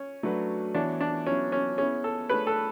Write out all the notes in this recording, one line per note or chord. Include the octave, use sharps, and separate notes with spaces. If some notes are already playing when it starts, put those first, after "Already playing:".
Already playing: C#4
F#3 A3 D4 F#4 B4
E3 B3 D4 F#4 C#5
D4
F#3 B3 C#4 E4
C#4
B3 C#4 E4 G#4
A4
A3 D4 G#4 B4 C#5
A4